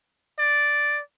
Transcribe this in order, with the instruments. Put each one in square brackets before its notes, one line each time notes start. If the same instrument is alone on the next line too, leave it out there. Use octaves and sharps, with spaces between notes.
[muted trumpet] D5